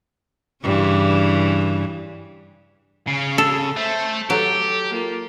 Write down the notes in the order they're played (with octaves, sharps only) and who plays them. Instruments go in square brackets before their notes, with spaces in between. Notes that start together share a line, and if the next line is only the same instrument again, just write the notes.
[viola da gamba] G2 C#3 E3
[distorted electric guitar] C#3 [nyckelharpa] C#5 F5
[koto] A4
[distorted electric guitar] A3 [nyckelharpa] C5 A5
[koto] F#3 [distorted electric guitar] G4 [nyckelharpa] A4
[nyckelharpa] A#3 F4